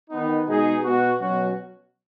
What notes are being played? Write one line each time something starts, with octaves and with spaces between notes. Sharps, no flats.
D#3 B3 D#4
B2 G#3 D#4 G#4
B2 B3 F#4
B2 F#3 C#4 F#4